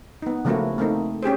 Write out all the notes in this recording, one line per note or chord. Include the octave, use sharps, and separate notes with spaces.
B3 D#4
C#3 F3 A3 A#3 E4 F#4
A3 A#3 C4 D#4
C#4 G4 G#4 C5